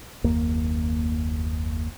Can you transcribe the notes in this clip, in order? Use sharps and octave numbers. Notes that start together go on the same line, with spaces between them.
F#1 D#2 A#3